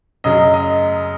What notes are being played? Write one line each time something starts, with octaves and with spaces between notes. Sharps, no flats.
F#2 C#3 F#3 D#5
D#5